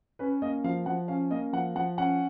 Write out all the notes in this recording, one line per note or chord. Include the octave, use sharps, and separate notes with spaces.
C#4 B4
A#3 D#5
F3 F5
F3 F#5
C#4 F5
A#3 D#5
F3 F#5
F3 F#5
C#4 F#5